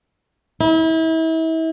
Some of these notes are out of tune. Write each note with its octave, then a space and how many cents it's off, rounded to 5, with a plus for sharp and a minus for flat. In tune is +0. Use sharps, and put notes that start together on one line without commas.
E4 -35